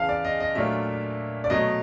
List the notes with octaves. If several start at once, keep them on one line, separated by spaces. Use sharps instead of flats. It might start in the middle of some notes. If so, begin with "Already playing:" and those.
Already playing: E2 C#3 E3 F5 A5
D5
D#5
D#5
A#2 F#3 A3 D4 F4 E5
D5
B2 F#3 A3 D#5